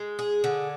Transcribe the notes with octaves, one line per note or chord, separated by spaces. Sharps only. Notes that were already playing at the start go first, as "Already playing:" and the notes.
Already playing: G#3
G#4
D3